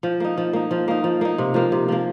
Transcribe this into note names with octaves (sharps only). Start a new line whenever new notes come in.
F3
A#3 D#4
F3
A#3 D#4
F3
A#3 D#4
F3
A#3 D#4
C3
F3 A#3
C3
F3 A#3